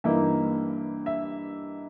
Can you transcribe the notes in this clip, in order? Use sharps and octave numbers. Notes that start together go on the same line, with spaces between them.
G2 E3 A#3 D#4 E5
E5